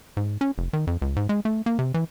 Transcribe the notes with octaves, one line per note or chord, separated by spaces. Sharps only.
G#2
C#4
F1
D#3
F2
C#2
G#2
G#3
A3
A#3
C3
E3